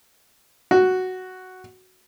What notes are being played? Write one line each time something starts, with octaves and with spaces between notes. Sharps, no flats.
F#4